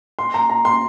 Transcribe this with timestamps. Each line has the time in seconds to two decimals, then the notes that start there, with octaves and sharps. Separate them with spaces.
0.19 C6
0.34 A#5
0.50 A#5
0.65 C6